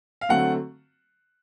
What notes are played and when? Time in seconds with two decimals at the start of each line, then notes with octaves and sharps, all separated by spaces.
0.21 F5
0.29 D3 F#3 A3 C4 F#5